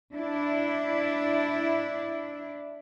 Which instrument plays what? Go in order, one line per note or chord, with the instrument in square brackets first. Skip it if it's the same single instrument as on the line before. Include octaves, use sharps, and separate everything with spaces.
[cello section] D4 E4